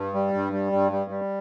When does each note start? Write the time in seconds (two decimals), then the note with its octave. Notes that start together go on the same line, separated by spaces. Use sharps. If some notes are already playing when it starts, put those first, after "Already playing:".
Already playing: G2
0.14 G3
0.33 G2
0.53 G3
0.72 G2
0.92 G3
1.10 G3